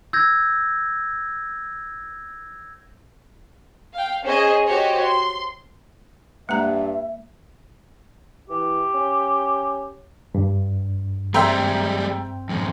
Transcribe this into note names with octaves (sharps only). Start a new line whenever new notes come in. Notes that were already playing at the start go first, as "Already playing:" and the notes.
E6 G6 G#6 A#6
F5 G5
C#4 G#4 C5 D#5
F#4 G4 C5 C#5 D#5
C6
G2 G#3 A#3 E5 A#5
E3 G4
C#4
G2
G3 G#3 C4 E5 G5 A#5
F2 G#2